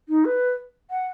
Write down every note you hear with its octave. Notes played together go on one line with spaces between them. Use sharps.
D#4
B4
F#5